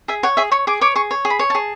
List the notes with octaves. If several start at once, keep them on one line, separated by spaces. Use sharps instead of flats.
G#4 E5
C#5 F#5
G#4 E5
C#5 C#6
G#4 D6
C#5 D6
G#4 C#6
C#5
G#4
B5
C#5
G#4 A5